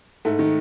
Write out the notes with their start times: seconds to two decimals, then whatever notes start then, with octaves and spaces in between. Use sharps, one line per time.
0.25 G#2 A3
0.39 D#3